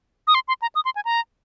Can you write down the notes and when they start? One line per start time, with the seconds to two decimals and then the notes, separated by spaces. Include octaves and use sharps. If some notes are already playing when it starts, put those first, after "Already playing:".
0.27 D#6
0.35 C6
0.48 C6
0.62 A#5
0.75 D#6
0.85 C6
0.96 G#5
1.05 A#5